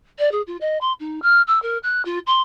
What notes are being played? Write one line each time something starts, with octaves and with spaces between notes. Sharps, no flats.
D5
G#4
F4
D#5
C6
D#4
F6
E6
A#4
F#6
F4
C6